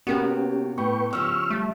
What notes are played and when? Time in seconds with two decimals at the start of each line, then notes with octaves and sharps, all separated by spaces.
0.07 C3 A#3 B3 C#4 F#4 G4
0.78 A2 B4 G5 C#6
1.13 C#3 F3 G4 C#6 E6 F6
1.50 G3 A3